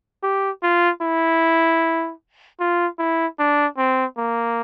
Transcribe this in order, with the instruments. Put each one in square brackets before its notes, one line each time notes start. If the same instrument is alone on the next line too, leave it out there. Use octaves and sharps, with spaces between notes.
[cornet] G4
F4
E4
F4
E4
D4
C4
A#3